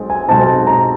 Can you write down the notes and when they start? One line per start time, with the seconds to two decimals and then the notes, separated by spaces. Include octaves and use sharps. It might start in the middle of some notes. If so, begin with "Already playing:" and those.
Already playing: B1 B2 G#3 C4
0.10 G#5
0.29 B1 B2 G#3 C4 A5
0.67 A#5